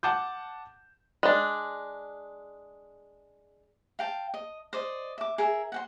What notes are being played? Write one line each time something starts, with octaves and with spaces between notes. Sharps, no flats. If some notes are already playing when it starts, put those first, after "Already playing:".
F#5 A5 D6 G6
G#3 D4
F5 G5 A5
D#5
C5 D5 D#5
E5 D6
G#4 A#4 E5
F#5 G5 C6